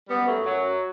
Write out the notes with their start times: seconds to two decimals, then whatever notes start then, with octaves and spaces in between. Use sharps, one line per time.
0.09 F#2 G3 B3
0.26 F#3 A3
0.44 F#2 F#3